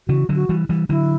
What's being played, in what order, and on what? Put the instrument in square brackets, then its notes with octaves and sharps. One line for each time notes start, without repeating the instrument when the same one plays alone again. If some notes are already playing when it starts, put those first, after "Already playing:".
[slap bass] C#3 E3 [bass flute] F#4
[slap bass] D3 F#3
[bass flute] F#4
[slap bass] E3 G3
E3 G3
[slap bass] D3 F#3 [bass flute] E4